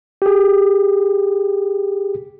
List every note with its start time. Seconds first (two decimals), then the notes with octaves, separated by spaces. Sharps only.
0.22 G4 G#4